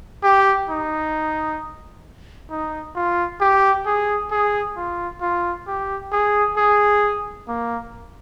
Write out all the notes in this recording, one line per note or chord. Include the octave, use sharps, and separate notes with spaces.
G4
D#4
D#4
F4
G4
G#4
G#4
F4
F4
G4
G#4
G#4
A#3